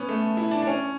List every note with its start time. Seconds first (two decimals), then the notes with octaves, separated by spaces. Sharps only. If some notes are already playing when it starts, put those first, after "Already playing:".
Already playing: B3 C#4
0.09 A3
0.37 E4
0.51 D4
0.62 D4
0.67 C#4